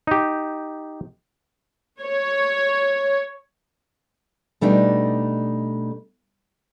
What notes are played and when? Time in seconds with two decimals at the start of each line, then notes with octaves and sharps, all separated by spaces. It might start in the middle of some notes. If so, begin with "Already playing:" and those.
0.07 D#4 G4
2.01 C#5
4.61 B2 G3 A3 D4 D#4